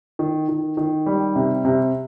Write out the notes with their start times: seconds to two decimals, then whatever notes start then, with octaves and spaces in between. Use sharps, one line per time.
0.19 D#3
0.48 D#3
0.77 D#3
1.06 G3
1.36 C3
1.65 C3